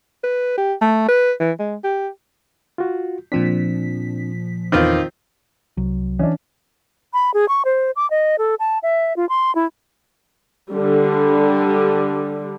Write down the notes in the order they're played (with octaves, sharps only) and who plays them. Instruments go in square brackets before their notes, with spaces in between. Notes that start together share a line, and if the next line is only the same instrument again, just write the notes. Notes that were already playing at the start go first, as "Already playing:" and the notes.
[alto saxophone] B4
G4
A3
B4
E3
G#3
G4
[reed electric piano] F4 F#4
[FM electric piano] A#2 F3 B6 [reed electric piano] C4 D4
[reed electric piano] E2 B4 D6 [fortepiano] D#3 C4 F4
[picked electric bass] C2 [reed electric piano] F#3
[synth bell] E3 [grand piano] C#4 D4
[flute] B5
G#4
C#6
C5
D6
D#5
A4
A5
E5
F4
C6
E4
[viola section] D3 G3